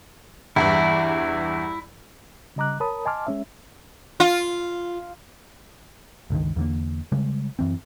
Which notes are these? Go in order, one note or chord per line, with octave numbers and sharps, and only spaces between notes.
E2 G2 E3 E4
C#3 G3 D#5 A#5 D6 F#6
A#4 C#5 A5 B5 D#6
D#5 G#5 A5 C6 D6 F6
G#3 C#4 E5
F4
G1 C#2 D3 D#3
E2 D3 A#3
C#3 G3 G#3
F#2 E3 C4